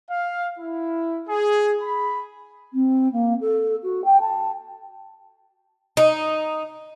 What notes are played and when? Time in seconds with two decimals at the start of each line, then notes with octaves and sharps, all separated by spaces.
0.10 F5
0.59 E4
1.29 G#4
1.82 B5
2.73 C4
3.12 A#3
3.40 A4
3.83 F#4
4.04 G5
4.20 A5
5.97 D#4